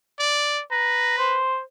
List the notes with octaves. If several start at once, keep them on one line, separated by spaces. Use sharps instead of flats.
D5
B4 A#5
C5